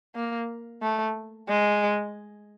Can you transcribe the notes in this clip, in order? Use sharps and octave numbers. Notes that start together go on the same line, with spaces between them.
A#3
A3
G#3